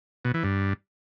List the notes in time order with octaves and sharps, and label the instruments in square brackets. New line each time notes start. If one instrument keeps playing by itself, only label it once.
[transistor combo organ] B2
E3
G2